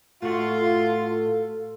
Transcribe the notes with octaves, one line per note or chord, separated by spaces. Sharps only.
A2 A3 F4 F#4 A4